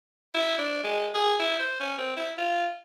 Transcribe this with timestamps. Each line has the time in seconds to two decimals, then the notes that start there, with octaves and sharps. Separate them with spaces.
0.34 E4
0.58 D4
0.84 G#3
1.14 G#4
1.39 E4
1.59 C5
1.80 C#4
1.98 C4
2.16 E4
2.38 F4